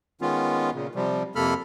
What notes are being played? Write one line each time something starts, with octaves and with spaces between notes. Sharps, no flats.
D#3 G#3 B3 C#4 F4
A#2 C#3
C3 F3 G3
F2 C3 A#3 A4 B5 F6